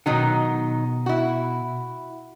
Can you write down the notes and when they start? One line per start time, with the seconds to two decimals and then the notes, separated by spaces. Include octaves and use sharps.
0.06 B2 D#3 F#3 D#4 F#5
1.06 E4 F#4